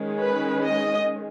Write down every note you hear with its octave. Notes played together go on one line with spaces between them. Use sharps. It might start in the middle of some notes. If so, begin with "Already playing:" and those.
Already playing: D#3 G#3 C#4
B4
D#5